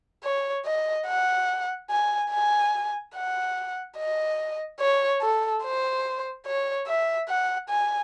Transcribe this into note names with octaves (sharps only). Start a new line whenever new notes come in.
C#5
D#5
F#5
G#5
G#5
F#5
D#5
C#5
A4
C5
C#5
E5
F#5
G#5